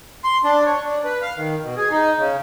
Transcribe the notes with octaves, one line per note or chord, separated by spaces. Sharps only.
C6
D4
C#5
D4
B4
F5
D#3
B2
G#4
D#4
C#3